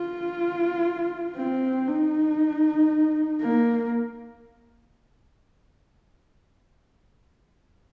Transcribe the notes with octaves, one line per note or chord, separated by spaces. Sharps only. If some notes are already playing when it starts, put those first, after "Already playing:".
Already playing: F4
C4
D#4
A#3